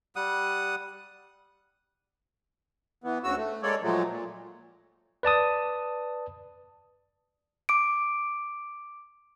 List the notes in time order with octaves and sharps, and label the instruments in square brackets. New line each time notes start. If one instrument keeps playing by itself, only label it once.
[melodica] G3 F#5 D#6
[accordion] E3 B3
D2 C#3 F#4 E6
A3
G#3 A#3 A4 C#5 D5
A#2 F3 F#3 G#3 A3
A#2
[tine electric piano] B4 D5 A5 D#6
[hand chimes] D6 D7